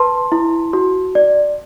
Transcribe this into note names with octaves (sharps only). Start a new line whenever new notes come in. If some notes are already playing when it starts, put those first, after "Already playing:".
Already playing: B4 A5 C6
E4
F#4
D5